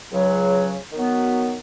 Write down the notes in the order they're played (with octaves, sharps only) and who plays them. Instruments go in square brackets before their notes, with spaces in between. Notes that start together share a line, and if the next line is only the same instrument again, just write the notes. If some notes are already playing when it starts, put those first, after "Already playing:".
[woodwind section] C#2 C#3 F#3
D#3 F#3 B3 F#4